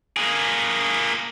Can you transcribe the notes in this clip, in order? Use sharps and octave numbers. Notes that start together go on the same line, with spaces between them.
A#3 G#4